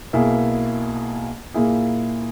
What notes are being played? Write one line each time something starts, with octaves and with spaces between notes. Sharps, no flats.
B1 B2 A#3 E4 G#4
A#2 A#3 E4 G#4